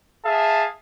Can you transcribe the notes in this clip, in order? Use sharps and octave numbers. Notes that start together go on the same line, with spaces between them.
G#4 E5 F5 A5